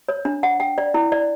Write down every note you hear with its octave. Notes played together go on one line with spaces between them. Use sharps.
C#5
D4
F#5
G5
D5
E4
D5